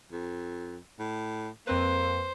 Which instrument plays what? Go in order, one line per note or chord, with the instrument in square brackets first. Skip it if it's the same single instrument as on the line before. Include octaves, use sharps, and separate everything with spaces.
[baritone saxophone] F2
A2
[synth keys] F2 C4 B4 [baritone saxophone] A#3 [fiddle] C5